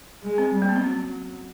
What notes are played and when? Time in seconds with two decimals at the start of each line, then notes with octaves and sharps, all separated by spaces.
0.23 G#3
0.38 C4
0.54 G3
0.62 A#3
0.69 B3
0.76 C4
0.83 F#3 C#4